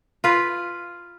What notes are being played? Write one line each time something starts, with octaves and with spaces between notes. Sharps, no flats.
F4 B4